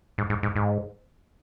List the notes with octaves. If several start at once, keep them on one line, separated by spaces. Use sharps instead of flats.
G#2
G#2
G#2
G#2